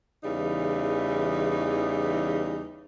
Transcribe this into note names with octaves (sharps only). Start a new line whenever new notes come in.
E2 C#3 E3 G3 D#4